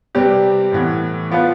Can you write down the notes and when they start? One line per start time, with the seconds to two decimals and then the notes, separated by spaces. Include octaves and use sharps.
0.15 C3 G3 C4 G4 B4
0.72 A2 E3 B3
1.31 F3 B3 F4 B4